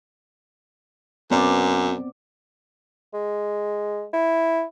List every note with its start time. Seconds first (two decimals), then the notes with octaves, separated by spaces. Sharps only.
1.31 F#2 B3 C4 D5
3.14 G#3
4.13 E4